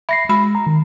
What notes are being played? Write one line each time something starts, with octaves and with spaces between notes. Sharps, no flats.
E5 B5 A#6 C7
G#3 F#4 B5
A#5
D#3